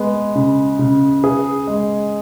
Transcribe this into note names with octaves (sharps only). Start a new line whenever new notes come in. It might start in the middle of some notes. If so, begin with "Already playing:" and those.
Already playing: G#3 B3
C#3
C#3
G#4
G#3